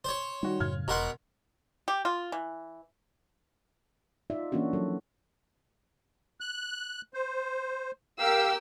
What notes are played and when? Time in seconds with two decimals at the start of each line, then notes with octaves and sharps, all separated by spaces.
0.05 C5 C#5
0.43 D#3 G3 F#4
0.60 F#2 A2 C#3 F6 G#6
0.88 E1 B2 A#4 F#5 A#5 C6
1.88 G4
2.05 F4
2.32 E3
4.30 D#4 F4 D5 E5
4.52 E3 A#3 C#4 D4 F#4
4.73 F3 F#3 A4
6.40 F#6
7.14 C5
8.18 G4 A#4 F5 E6